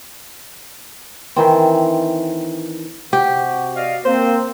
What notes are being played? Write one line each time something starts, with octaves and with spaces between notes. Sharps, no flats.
D#3 E3 C4
C3 F#4 G4
D5 D#5 F5
A#3 C4 C5